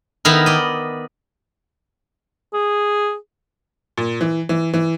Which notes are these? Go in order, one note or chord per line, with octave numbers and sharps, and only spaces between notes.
D#3 B3 E4 A#4
D5 D#5
G#4
A#2
E3
E3
E3